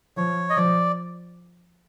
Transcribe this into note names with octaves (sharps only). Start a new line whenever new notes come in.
F3 C#5
D#5
F3 D5